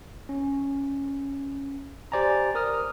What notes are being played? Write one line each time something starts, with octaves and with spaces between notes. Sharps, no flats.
C#4
G4 C5 D5 G#5 A#5
A#4 D#6 F6